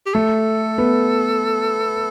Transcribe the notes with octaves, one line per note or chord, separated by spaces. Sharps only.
G4
A3 A4
B3